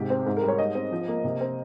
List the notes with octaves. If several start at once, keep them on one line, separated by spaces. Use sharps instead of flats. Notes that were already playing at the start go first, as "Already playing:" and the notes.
Already playing: G#2 C3 G4
C4
G#2
A#4
G3
C#5
G#2 D#5
C4
F3
A#3
C3
C4